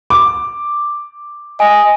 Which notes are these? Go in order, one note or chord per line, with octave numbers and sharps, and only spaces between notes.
D6
D#5 G#5